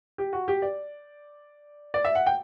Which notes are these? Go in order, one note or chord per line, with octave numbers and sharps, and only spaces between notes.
G4
F#4
G4
D5
D5
E5
F#5
G5